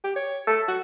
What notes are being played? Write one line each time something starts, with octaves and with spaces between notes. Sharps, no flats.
G4
C#5
A4
F#4